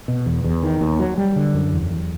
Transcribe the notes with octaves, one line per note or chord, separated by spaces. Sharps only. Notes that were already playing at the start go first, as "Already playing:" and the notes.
B2
E2
E2
D#3
D#2
F#3
G3
D3
F#2
E2
E2